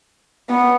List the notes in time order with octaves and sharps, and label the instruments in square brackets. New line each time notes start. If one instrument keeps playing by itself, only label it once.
[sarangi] B3